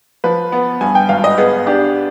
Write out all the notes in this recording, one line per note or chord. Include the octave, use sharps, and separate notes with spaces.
F3 B4
B3
G2 G#5
G5
G#1 F5
D#5
B3 G#4
D4 G4